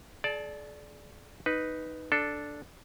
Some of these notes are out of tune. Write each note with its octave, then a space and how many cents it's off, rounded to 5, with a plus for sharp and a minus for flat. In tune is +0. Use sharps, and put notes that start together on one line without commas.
G#4 +45 D5 +0 A5 +0
D#4 +0 B4 +0
D4 +0 A4 +0